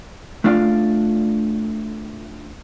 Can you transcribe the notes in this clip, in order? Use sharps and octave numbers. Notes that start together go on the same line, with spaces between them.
A3 D4 F4 D5 F5